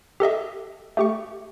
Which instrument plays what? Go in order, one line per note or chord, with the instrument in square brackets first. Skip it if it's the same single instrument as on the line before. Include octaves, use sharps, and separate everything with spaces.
[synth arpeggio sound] G4 A4 D#5 E5
A3 G4 C#6